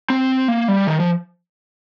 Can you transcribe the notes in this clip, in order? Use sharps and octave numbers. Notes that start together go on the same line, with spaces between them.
C4
A#3
G3
D#3
F3